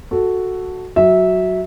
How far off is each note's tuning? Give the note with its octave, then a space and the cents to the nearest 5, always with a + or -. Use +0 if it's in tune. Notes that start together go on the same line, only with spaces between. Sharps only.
F#4 +0 A4 +0
F#3 +0 E5 -15